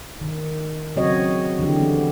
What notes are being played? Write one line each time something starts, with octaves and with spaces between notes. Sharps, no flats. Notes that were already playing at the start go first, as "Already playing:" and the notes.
D#3
C#3 F#3 C4 F#4 C#5 D#5
D3 E3 F3 G4
B3